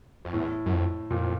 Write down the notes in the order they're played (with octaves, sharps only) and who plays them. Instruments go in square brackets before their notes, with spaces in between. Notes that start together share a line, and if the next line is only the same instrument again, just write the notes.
[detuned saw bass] F2
[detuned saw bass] E2 [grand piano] A2
[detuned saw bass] F#2
F2
[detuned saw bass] F2 [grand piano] A#2